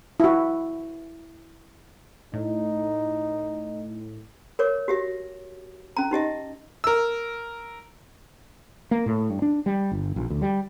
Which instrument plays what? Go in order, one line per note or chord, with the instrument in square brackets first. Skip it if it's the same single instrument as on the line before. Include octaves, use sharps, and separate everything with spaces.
[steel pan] E4 F#4
[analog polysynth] A2 [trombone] D#4
[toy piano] A#4 C#5 D6
F#4 G4 E5
C#4 A#5
D#4 G4 D#5 E5
[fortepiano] A#4 E6
[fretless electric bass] A#3
A2
G2
D4
G3
G1
A#1
D2
G3